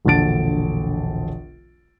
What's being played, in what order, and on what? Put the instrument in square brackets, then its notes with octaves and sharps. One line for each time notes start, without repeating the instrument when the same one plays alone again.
[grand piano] E1 A#1 D3 A5 A6 D7